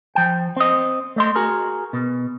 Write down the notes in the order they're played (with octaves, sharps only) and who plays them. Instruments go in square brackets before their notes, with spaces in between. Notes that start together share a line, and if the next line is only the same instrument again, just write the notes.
[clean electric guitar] F3 G5
C4 D#5
A3 D#5 C6
F#4 G#4 A#4
B2